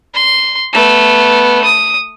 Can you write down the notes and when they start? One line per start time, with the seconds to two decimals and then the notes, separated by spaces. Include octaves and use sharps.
0.14 C6
0.73 A3 B3
1.64 D#6